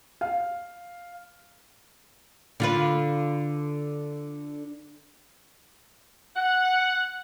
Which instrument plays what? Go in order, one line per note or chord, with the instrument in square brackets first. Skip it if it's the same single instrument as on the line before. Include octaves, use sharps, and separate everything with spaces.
[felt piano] F5
[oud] D3 F4 B4
[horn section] F#5